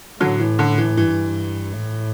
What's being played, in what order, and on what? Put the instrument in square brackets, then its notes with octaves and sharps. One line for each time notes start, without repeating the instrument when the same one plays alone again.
[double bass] A2 [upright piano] D3 F#3
[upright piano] E3
D3
E3
[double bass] G2 [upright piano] E3
[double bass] A2